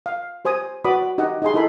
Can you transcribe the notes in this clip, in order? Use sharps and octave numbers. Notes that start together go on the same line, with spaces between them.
F5
G4 C5 G#5 D#6
F#4 B4 D5 B5 D6 D#6
D#4 G4 D#5 F#5
D#4 G4 G#4 C6
D#4 E4 G#4 A4 B5